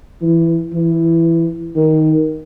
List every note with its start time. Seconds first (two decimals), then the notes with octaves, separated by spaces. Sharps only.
0.22 E3
0.73 E3
1.76 D#3